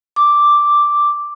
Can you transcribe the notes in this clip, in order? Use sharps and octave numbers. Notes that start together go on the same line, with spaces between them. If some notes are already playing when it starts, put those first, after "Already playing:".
D6